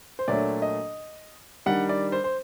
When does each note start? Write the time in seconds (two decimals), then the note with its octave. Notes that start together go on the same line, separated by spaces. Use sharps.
0.19 C5
0.28 A#2 F#3 A3 D4 D5
0.62 D#5
1.66 D#3 G3 D4 F#5
1.89 D5
2.12 C5
2.24 C5